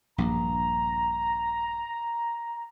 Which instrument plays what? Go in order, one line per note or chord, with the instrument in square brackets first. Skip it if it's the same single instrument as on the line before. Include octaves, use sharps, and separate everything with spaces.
[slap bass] A#1 G2 [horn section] A#5